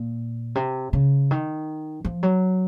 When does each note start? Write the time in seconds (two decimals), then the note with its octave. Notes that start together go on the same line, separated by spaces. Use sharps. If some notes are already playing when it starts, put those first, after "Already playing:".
Already playing: A#2
0.55 C3
0.93 C#3
1.31 D#3
2.05 F3
2.23 F#3